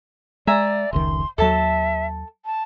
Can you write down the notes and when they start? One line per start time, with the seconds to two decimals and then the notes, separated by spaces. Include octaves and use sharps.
0.47 G#3 D5 E5 G#5 A#5
0.93 F1 C#2 D#3 C6
1.38 D#2 F#3 A4 E5 A5
2.46 A5